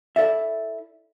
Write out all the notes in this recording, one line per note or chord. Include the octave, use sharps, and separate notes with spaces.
E4 A4 D5 E5